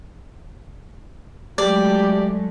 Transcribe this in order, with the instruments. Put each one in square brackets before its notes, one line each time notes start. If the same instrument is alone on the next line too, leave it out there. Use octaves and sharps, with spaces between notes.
[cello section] F#3 G#3 A3 [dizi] G4 [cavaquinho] D5